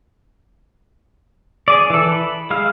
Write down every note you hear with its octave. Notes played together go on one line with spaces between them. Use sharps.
G#4 D5
E3 A4
B5
G#3 E4 F5 F6